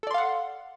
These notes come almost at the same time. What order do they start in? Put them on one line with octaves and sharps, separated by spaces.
A4 D5 C6 F5 F#5